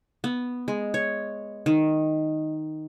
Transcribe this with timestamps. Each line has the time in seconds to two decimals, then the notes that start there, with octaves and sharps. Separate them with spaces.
0.24 B3
0.68 G#3
0.94 C#5
1.66 D#3